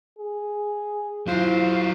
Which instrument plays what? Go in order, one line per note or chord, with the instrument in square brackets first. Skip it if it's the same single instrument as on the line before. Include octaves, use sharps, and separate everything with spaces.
[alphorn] G#4
[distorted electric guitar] F#3 C5 [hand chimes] E4 F4 [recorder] F5